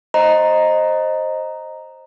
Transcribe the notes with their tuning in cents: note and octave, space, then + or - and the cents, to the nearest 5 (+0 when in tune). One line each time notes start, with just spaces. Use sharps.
C5 +15 D#5 +0 A#5 +0